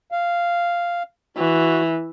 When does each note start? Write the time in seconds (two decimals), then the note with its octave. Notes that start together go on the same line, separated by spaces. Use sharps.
0.12 F5
1.37 E3 F#4